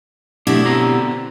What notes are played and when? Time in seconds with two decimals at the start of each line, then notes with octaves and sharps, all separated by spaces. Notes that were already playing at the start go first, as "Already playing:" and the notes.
0.47 B2 A3 D4 E4 G4
0.65 D3 C4 A#5